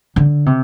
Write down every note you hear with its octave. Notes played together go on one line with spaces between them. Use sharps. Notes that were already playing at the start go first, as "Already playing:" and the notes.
D3
C3